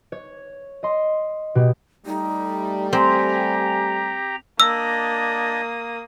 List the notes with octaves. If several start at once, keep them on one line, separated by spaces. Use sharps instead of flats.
C#5
D#5 C6
B2 G4
G3 A3 D#4
C4 G4 G#5 A#5
A#3 D4 D5 D#5 D#6 E6